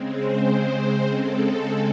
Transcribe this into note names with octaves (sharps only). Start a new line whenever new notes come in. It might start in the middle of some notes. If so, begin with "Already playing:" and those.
Already playing: C#3 G#3 C4
C5
A4